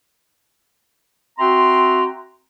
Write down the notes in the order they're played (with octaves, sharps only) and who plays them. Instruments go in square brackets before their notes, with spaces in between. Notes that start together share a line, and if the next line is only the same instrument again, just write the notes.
[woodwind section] C4 F#4 E5 G5 A#5 C6